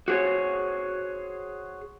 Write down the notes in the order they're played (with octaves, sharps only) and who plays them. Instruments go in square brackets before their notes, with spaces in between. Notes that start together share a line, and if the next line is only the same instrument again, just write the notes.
[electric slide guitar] F#4 G#4 C5 C#5